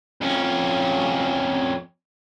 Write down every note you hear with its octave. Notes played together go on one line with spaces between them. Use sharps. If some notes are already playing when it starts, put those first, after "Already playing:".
F2 C#4